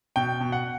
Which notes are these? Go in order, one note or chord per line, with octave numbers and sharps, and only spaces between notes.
B2 G5
B2
F#5